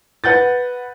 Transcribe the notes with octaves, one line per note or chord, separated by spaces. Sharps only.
B4 F#5 G6 A6